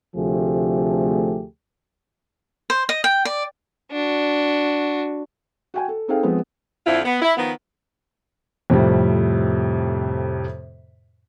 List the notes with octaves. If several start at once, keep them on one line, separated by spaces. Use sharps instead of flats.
D2 C3 F3 A3 G4 G#4
C5
D#5
G5
D5
D4 F#4
F#4 G5 G#5
A4
C4 D#4 G#4 A4 F5 G5
F3 G#3 B3 C4
F2 D3 F3 E4 F4
B3
E4
D#3 F3 B3
F2 A2 C3 F3 G3